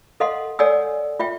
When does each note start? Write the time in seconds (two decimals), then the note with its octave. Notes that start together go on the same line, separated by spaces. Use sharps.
0.20 A4 D#5 F5 F#5 C6
0.59 A4 C#5 D5 F#5 G#5 E6
1.20 F4 E5 G5